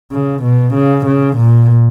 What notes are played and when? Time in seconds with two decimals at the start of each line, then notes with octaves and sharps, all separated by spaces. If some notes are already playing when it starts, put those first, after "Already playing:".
0.12 C#3
0.43 B2
0.75 C#3
1.06 C#3
1.37 A#2